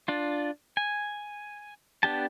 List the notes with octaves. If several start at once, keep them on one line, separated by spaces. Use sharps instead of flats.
D4 F4
G#5
B3 D4 G4 A5